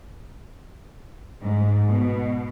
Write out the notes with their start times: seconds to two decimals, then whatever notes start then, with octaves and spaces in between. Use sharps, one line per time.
1.43 G#2
1.87 B2